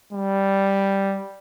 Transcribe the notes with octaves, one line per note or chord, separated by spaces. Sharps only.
G3